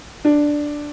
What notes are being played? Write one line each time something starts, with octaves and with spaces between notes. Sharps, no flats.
D4